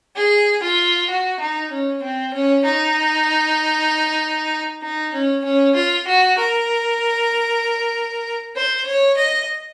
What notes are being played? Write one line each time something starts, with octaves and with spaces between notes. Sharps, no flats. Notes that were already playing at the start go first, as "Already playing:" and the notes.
G#4
F4
F#4
D#4
C#4
C4
C#4
D#4
D#4
C#4
C#4
F4
F#4
A#4
C5
C#5
D#5